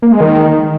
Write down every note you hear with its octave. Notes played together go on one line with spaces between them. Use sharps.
A#3
G#3
D#3